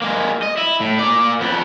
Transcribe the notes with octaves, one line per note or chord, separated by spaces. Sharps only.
G#3 A#3
D#5
E4
A2
A#3 D5
F2 B3